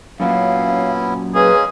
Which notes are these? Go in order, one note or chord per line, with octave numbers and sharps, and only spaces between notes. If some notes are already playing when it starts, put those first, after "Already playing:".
F#2 A#2 F#3 B3 C#4 E4 F5
G#3 A#3 C#4 G#4 B4